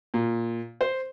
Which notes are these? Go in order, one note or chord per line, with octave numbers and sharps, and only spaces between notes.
A#2
C5